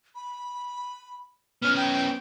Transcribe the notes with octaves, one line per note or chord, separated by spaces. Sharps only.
B5
B3 C#4 F6
G5